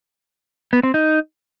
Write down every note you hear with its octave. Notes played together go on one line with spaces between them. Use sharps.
B3
C4
D#4